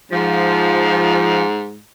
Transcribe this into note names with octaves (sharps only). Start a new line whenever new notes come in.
G#2 F3